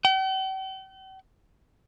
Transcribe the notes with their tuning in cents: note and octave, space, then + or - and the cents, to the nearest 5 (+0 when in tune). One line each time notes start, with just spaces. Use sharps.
G5 -45